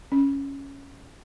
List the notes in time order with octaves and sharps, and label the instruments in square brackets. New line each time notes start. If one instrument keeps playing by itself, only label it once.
[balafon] C#4